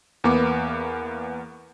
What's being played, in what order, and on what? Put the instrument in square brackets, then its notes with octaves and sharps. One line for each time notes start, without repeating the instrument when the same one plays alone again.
[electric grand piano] E2 A#3 B3 D6